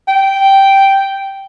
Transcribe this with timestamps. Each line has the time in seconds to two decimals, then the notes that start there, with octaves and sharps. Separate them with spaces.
0.08 G5